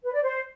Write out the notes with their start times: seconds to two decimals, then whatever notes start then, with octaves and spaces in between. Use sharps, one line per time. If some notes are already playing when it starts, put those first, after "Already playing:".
0.04 B4
0.13 D5
0.23 C5